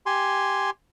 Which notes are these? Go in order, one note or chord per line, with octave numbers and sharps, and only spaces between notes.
G4 G#5 C6